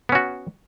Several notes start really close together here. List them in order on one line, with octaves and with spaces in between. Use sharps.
B3 C#4 F#4